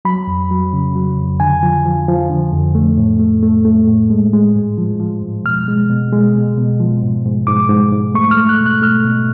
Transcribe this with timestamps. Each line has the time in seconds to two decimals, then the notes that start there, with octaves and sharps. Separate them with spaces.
0.05 F#3 B5
0.27 F2
0.51 F#3
0.73 C#3
0.96 F#3
1.17 F2
1.40 D3 G#5
1.63 F3
1.85 F3
2.08 F3
2.30 D3
2.53 F2
2.75 A3
2.98 A2
3.20 A3
3.43 A3
3.65 A3
3.87 A2
4.10 G#3
4.33 G#3
4.56 G#2
4.78 F3
5.00 F3
5.22 G#2
5.44 B2 F6
5.68 G#3
5.90 B2
6.13 G#3
6.36 B2
6.58 B2
6.80 F3
7.02 G#2
7.26 G#2
7.47 G#2 D6
7.69 G#2
7.92 G#2
8.14 A3 C#6
8.31 F6
8.37 A3
8.49 F#6
8.60 B2
8.66 F#6
8.82 A3 F6
9.05 B2